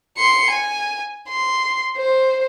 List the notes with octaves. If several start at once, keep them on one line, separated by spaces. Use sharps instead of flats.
C6 C#7
G#5
C6
C5